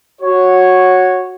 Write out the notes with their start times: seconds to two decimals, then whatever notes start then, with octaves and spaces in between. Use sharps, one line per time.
0.21 F#4 C#5